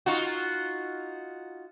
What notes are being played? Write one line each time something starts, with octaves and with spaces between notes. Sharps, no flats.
D#4 F4 F#4